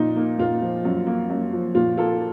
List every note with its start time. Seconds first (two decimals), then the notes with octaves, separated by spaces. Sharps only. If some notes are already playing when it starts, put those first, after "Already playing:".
Already playing: A#2 F3 D#4
0.16 A#3
0.39 A#2 F4
0.62 F3
0.85 F#2
1.06 A#3
1.30 F#2
1.53 F3
1.75 A#2 F4
1.97 A#3 F4 A4